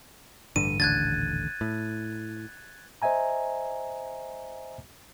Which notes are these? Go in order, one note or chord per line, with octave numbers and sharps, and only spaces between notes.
A1 G2 D3 D#7
D#1 A1 D3 F#6 G#6 A6
A2
C5 D#5 E5 G#5 A#5